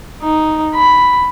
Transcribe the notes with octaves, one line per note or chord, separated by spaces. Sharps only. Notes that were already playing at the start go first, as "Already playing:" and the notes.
D#4
B5